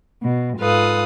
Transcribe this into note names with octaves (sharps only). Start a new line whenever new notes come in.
B2
G#2 F4 A4 B4 F5 D#6